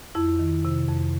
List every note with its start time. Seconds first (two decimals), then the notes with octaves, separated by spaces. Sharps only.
0.15 F2 E4
0.39 D#3
0.65 C3
0.89 F2